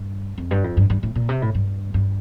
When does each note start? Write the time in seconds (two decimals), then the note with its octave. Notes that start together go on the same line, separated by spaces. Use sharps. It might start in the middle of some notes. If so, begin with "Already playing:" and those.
Already playing: G2
0.38 F2
0.51 G2
0.64 F2
0.77 G2
0.90 G2
1.03 A2
1.15 A#2
1.29 C3
1.42 A2
1.55 G2
1.94 G2